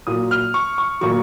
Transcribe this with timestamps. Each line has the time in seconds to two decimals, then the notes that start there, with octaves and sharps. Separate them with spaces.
0.07 A#2 F#3 D#6
0.31 F6
0.54 C#6
0.78 C#6
1.01 A#2 F#3 C#6